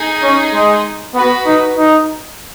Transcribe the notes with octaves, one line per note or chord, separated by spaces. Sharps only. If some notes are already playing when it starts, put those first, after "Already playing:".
Already playing: D#4 G#4
C#4
G#3
B3 F#4 B4
D#4
D#4